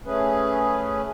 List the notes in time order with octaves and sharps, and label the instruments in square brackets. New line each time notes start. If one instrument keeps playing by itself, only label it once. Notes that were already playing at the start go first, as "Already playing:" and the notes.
[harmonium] A3 C#4 G#4 B4